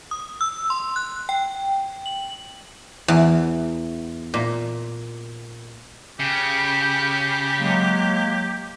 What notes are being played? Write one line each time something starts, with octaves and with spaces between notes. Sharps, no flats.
D#6
E6
C6
F#6
G5
F#7
E2
A#2
C#3 G4
F#3 G#3 A#3